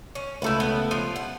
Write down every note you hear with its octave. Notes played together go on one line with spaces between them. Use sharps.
C#4
C#2 A3 E4 F#4 B4
B3
F3 F4
F#5